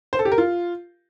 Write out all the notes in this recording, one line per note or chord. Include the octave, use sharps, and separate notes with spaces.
C5
A4
G4
A#4
F4